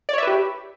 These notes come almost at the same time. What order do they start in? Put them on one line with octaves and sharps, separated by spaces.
D5 C#5 E5 B4 G4